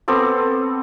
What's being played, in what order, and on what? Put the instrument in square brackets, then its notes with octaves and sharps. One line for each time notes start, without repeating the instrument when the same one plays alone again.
[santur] B3 C4 A4 D6